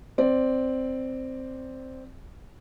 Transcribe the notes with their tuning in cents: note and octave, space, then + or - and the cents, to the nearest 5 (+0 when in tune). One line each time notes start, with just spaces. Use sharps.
C4 +0 D5 +0